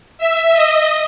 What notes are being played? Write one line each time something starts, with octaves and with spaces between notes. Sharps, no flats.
E5
D#5